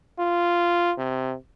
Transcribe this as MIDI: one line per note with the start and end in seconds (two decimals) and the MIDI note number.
0.19 0.93 65
0.98 1.35 48